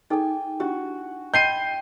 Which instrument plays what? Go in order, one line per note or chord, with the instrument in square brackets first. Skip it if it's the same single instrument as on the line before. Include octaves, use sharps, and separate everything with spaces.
[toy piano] D#4 G#4 A4 [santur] G5 G#5
[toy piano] D4 E4 G4 [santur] F#4
[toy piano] D#5 B5 C6 [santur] G5 [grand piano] G6 C7 D#7